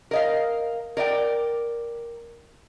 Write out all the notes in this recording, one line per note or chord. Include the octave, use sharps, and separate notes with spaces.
A#4 D#5 F5
A#4 D5 D#5 G5